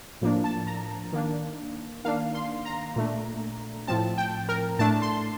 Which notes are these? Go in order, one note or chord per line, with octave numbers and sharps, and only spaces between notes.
A2 F3 A#3 D4
A5
A#5
D#3 A#3 D4
D#3 A#3 D4 F5
C6
A#5
A#2 A3 D4
A2 F3 C4 A5
G5
A#4
A2 A3 D4 A5
C6